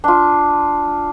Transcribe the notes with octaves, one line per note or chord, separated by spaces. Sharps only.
D4 F4